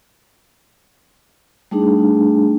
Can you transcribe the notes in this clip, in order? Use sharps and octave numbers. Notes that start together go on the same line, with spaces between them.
G3 A3 D4 D#4 G#4